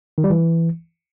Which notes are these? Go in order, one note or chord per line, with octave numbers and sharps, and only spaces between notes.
D#3
G3
E3